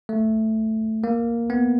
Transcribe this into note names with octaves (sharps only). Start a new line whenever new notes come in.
A3
A#3
B3